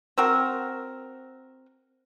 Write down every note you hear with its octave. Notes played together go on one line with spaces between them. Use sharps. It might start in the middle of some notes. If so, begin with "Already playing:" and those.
C4 F#4 A#4